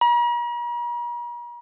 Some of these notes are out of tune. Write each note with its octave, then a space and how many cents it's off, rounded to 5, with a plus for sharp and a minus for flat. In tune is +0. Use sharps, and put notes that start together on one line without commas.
A#5 +45